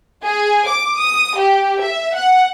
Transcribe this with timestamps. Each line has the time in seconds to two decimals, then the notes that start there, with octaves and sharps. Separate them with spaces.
0.25 G#4
0.67 D6
0.99 D#6
1.38 G4
1.83 E5
2.15 F#5